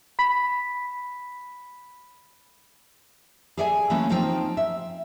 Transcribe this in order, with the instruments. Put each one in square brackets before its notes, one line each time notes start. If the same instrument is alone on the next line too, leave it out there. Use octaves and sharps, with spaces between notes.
[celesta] B5 B6
[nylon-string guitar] G#4 A4 D5 E5 G5 G#5
E3 A3 A#3 C#4
F3 C4 D#4 F4 C5 G5
E5